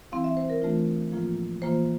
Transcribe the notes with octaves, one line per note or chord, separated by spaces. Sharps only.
E3 G3 C4 E4 F5
E5
C5
A#4
E3 A3 D4 F4
A2 F3 A#3 F4
E3 A#3 F4 C5